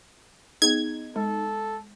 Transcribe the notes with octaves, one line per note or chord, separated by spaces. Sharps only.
B3 D#4 G#4 G#6
G#3 A4